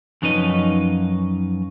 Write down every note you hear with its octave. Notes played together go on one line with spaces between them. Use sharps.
F#2 F3 C#4 D#4 B4 D#5